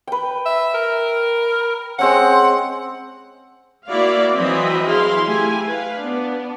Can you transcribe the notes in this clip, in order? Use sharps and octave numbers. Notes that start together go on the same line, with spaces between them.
B4 G5
E5
A#4
G#3 C4 C#4 F#5
A#3 E4 F#4 D5 F5
E3 F#3 C4 D#5 E5 B5
E4 G#4 F5 C6
A3 E4 G4 G#5
B4 F5
B3 D4